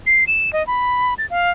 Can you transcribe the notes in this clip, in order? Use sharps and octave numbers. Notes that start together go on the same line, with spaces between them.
C7
E7
D#5
B5
A6
F5